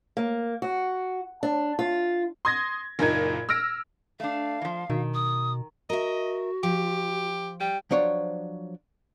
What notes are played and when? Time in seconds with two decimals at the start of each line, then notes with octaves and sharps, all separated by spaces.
0.17 A#3
0.62 F#4
1.43 D4
1.79 F4
2.45 C6 D#6 G#6 A#6
2.99 F#1 A#2 D#4 G#6
3.49 E6 F6 A#6 D7
4.20 A3 D4 F5
4.62 E3 F3
4.90 B2 D#3
5.14 D#6
5.90 F#4 A#4 D#5 E5
6.63 F3 G4
7.60 G3 G5
7.91 F3 F#3 D4 C5 C#5